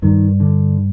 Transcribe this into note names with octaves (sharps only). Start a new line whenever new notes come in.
G2 D#3
D3